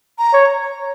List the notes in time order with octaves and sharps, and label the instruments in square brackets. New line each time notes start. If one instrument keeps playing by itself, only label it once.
[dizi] A#5
[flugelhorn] C#5